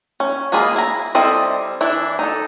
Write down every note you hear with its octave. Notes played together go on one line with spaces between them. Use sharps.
C#4
G#3 A#3 F4 G#4 B5
E4 A#5
G3 C4 E4 A4 D#5
E3 D4 E4
D#4 A4